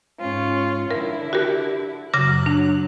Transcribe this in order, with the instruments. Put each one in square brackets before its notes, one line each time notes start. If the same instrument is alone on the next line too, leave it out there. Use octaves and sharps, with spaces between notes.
[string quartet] G#2 C#4 F4
[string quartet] D3 E4 [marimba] A#4
[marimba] F#4 G4 A#4
[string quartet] F#2 F#3 F#6 [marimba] C#3 D6 A#6
[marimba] D4